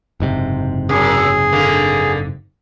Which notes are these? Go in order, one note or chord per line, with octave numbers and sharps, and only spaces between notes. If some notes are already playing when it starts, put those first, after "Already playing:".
F#1 G#2 C3
F#2 G#4
D3 A#3